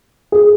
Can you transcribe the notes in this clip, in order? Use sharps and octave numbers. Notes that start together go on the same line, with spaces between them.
G#4